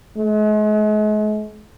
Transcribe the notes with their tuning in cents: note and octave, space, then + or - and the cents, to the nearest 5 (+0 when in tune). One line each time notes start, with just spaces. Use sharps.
G#3 +40